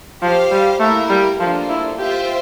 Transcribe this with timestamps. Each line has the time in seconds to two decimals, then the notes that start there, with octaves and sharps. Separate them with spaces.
0.21 F3 G4 C5 F5
0.52 G3
0.80 A3 A#3 E4 A#4
1.10 G3
1.40 F3 A#3 D4 F4 A4 C5
1.69 E4
1.98 F4 G4 C5 E5 G5